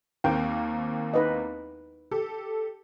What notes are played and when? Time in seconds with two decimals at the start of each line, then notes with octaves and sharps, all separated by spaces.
0.24 D#2 A#3 C4 G5
1.14 D#4 B4 D#5
2.11 G4 A4